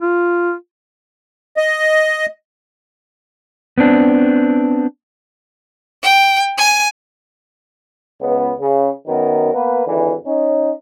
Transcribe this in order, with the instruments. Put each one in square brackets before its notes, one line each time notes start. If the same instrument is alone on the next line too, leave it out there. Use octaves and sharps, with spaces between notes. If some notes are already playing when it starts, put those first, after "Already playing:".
[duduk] F4
[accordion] D#5
[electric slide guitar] B3 C4 D4
[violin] G5
G#5
[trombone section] C#2 B3
C#3
F#2 D#3 B3 A#4
A#3 B3 B4
G#1 D3 E3
C#4 D#4